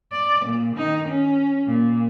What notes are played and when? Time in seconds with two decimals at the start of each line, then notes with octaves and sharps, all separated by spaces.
0.12 D5
0.46 A#2
0.76 D#3 D#4
1.08 C#4
1.67 A#2